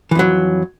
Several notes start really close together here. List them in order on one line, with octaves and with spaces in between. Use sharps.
E3 F2 F#3